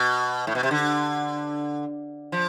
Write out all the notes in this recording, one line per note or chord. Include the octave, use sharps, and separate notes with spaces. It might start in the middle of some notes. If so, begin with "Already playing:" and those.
Already playing: B2
A2
B2
C3
D3
F3